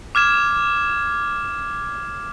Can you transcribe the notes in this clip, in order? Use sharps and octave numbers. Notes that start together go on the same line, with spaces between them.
D6 F6 G#6 E7